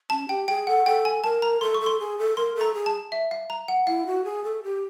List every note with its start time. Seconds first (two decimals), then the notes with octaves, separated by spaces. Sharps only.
0.10 C#4 A5
0.29 G4 G5
0.48 G#4 G5
0.67 A4 F#5
0.86 A4 G5
1.05 G#5
1.23 A#4 A5
1.42 A#5
1.60 A4 C6
1.74 C#6
1.81 A4
1.86 C6
1.99 G#4
2.18 A4
2.36 A#4 C6
2.55 A4
2.61 A#5
2.74 G#4
2.86 A5
3.12 E5
3.31 F5
3.50 A#5
3.68 F#5
3.87 E4 F5
4.06 F#4
4.24 G#4
4.44 A4
4.63 G4